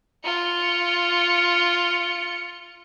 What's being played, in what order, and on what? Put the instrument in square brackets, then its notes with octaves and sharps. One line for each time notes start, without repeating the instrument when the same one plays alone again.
[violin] F4 C#7